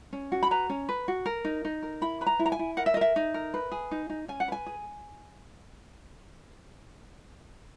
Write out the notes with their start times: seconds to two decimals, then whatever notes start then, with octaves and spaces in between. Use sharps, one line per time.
0.13 C#4
0.32 F#4
0.43 B5
0.51 B4 A#5
0.70 C#4
0.89 B4
1.08 F#4
1.26 A#4
1.45 D#4
1.65 D#4
1.83 A#4
2.02 E4 B5
2.21 B4 B5
2.26 A#5
2.39 E4
2.46 A#5
2.52 G#5
2.59 E4
2.77 A#4 F#5
2.86 E5
2.94 D#5
2.97 A#4 E5
3.16 D#4
3.34 A#4
3.54 B4
3.72 G#4
3.91 D#4
4.10 D#4
4.28 C#4 G#5
4.40 F#5
4.48 B4 G#5
4.66 G#4